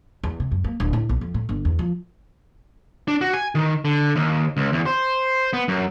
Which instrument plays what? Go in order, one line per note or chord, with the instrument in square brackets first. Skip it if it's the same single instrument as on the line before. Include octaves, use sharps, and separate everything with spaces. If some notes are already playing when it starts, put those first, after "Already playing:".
[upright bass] E2
C3
F#2
A#3
D1
A2
B1
F2
A2
G1
E2
F3
[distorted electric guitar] D4
F#4
G#5
D#3
D3
D#2
C#2
E2
C5
B3
F#2